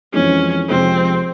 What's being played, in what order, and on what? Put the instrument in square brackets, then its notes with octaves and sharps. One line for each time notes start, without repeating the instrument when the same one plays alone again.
[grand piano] F2 E3 G#3 [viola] C#4
[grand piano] F2 C3 F3 G#3 [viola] C4